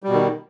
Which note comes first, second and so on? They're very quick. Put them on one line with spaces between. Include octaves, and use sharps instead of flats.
G3 B2 D#3